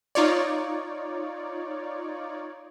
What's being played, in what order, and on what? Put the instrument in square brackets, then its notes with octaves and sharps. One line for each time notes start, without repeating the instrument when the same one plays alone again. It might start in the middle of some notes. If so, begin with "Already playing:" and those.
[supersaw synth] D#4 F4 C#5 D5